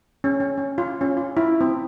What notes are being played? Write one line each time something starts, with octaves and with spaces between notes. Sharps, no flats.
C#4
C#4
C#4
F4
C#4
F4
E4
C4